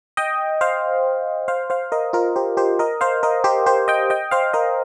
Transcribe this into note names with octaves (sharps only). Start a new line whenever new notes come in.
D#5 G5
C5 F5
C5 F5
C5 F5
A#4 D#5
F4 A#4
G4 C5
G4 C5
A#4 D#5
C5 F5
A#4 D#5
G4 C5
G4 C5
D#5 G5
D#5 G5
C5 F5
A#4 D#5